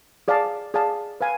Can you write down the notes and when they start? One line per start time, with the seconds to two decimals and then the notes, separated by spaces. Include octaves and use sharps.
0.28 G#4 D5 F5 A5
0.74 G#4 D5 F5 A5
1.21 B4 F5 G#5